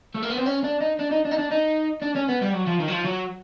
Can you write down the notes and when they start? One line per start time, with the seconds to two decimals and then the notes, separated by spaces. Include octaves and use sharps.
0.15 A3
0.23 A#3
0.30 B3
0.38 C4
0.47 C#4
0.64 D4
0.81 D#4
0.99 D4
1.11 D#4
1.25 D4
1.31 D#4
1.38 D4
1.50 D#4
2.02 D4
2.15 C#4
2.28 B3
2.41 G3
2.53 F#3
2.66 F3
2.80 D#3
2.88 F#3
2.92 F3
3.05 F#3